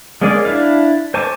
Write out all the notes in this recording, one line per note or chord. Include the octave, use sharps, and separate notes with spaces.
G#3 A#3 C#4 G#4 D5
D4 E4 F5
C5 G#5 A5 C#6 D6